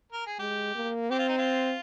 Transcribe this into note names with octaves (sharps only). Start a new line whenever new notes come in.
A#4
G#4
G#3 G4
A#3
C4 G4
F4
D#4
F4